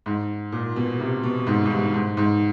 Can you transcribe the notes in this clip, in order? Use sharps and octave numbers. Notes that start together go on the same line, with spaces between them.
G#2
A#2
B2
C3
B2
G#2
G#2
G2
G#2
G#2